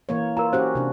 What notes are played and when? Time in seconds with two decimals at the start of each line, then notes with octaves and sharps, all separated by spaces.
0.09 E3 A#3 C#5
0.37 F4 A#4 A#5
0.53 C#4 F#4 G4 C5
0.75 C3 D4